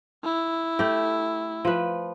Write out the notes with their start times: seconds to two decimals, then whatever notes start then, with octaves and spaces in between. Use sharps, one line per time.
0.24 E4
0.79 A3 G4
1.65 F3 B4